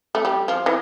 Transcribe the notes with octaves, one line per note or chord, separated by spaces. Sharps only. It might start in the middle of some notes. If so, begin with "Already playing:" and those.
A3
G3
F3
E3